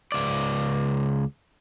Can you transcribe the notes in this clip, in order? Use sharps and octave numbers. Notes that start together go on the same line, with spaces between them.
C#2 D5